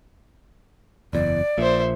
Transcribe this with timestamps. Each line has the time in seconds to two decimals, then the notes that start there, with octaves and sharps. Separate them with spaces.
1.13 F#1 E2 D5
1.58 A#1 A#2 C5 E5